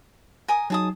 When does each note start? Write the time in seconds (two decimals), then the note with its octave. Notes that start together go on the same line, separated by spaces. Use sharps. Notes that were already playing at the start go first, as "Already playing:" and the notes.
0.48 A#4 G#5 D#6
0.70 F#3 D#4 G#4 A5 D#6